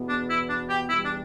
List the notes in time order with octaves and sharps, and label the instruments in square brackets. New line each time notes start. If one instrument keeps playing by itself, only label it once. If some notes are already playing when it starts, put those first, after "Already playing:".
Already playing: [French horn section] E2 B2 B3
[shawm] D4
E4
D4
G4
[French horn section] E2 B2 G3 [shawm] E4
[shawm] D4